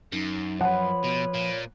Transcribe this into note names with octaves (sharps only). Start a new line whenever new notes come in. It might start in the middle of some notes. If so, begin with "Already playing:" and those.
F#2 D#4
F3 B4 C#5 F#5
B2
A#2